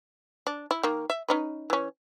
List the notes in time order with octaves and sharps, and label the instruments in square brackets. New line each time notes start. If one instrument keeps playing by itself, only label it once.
[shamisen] D4
E4
D#3 A#3
E5
C#4 D#4 B4
E3 C#4